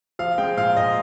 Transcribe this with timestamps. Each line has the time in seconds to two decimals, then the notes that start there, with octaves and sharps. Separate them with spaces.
0.19 F3 F5
0.38 G#3 G5
0.57 A#2 F5
0.77 A#2 D#5